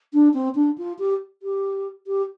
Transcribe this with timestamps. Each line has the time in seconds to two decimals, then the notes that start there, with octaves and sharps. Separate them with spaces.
0.13 D4
0.34 C4
0.55 D4
0.78 F4
0.99 G4
1.43 G4
2.07 G4